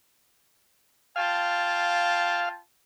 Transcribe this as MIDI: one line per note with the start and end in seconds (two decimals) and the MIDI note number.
1.16 2.61 65
1.16 2.49 77
1.16 2.61 79
1.16 2.61 81